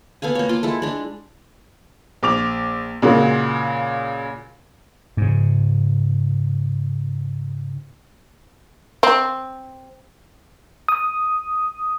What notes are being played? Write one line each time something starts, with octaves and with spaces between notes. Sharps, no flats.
B3 A4 F5 G#5
A#3 C#5
F4 C6 D6
G#3 E4 A4
G#3 D4
A#1 D6 F7
A#2 C#3 G#3 F#4 A#4
G#2 C#3
C4
D#6